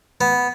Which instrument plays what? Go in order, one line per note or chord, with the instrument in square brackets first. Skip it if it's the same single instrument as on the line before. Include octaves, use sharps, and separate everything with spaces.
[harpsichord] B3